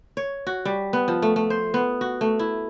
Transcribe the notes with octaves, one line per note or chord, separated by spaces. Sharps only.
C#5
F#4
G3
B3
F3
A3
A3
C5
B3
F#4
A3
E4